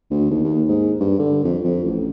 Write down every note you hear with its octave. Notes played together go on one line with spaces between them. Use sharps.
D2
D#2
D#2
G#2
G2
D3
F2
F2
A1